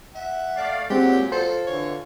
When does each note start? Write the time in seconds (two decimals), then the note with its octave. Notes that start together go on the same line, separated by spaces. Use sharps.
0.15 E5 F#5
0.56 A3 D5 F5
0.90 A#2 F#3 G#3 C4 G4 F#5
1.32 F4 A4 C5
1.67 D3 E3 C#5